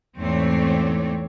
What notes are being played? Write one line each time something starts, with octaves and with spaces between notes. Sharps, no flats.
E2 G#2 A3 C4 C#5 D5